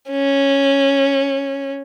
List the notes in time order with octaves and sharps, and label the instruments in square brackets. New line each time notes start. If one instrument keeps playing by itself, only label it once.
[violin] C#4